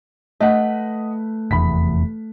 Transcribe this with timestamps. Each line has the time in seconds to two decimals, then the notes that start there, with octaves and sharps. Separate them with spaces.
0.40 A3 B4 D#5 F#5
1.51 F1 E2 B5 B6